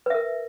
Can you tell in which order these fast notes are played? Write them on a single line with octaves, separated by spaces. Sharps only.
B4 E5 A#4